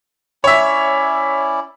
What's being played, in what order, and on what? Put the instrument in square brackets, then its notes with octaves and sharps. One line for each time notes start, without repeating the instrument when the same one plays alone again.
[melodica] C#4 E4 D5 [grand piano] C#5 E5